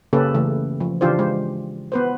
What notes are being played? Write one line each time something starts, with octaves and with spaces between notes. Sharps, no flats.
C#3 A#3 C#4 G4 A4 B4
C#3 E3 A3
F3
C#3 E3 D4 F4 G4 C5
G#3 C5
B3 B4 C5